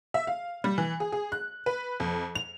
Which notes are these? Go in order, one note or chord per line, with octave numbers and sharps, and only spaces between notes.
E5
F5
G3
E3
G#4
G#4
F#6
B4
F2
F7